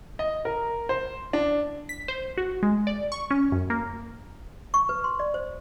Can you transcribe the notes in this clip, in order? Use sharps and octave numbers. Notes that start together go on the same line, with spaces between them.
D#5
A#4
C5
D4
B6
C5
F#4
G#3
D5
C#6
C#4
F#2
A#3
C#6
B4
C6
D5
C5